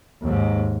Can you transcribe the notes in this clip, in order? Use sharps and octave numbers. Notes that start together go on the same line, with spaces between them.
D#2 G#2